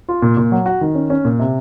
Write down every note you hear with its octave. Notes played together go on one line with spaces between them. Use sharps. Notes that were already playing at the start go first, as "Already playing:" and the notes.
F4
A#2
A#2
F#3
F#4
D#3
C#4
C#4
A#2
C3